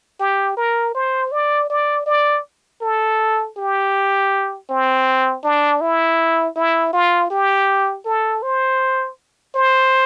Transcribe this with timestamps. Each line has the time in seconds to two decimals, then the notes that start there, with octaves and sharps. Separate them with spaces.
0.20 G4
0.57 A#4
0.95 C5
1.32 D5
1.70 D5
2.06 D5
2.82 A4
3.57 G4
4.69 C4
5.44 D4
5.81 E4
6.56 E4
6.93 F4
7.31 G4
8.06 A4
8.43 C5
9.55 C5